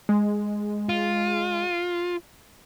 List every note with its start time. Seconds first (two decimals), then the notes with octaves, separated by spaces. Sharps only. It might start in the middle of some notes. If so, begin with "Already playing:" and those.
0.09 G#3
0.89 F4